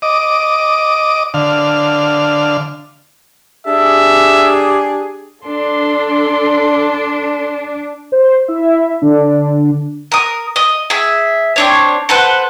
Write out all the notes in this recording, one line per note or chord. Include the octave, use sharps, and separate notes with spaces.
D#5 D6
D3 F5
D4 G4 G#4 E5
D4 A4 C6
C5
E4 E5
D3 D4
A#4 D#6
D#5
G#4 E5
C4 D4 C#5
A4 B4 C5 F#5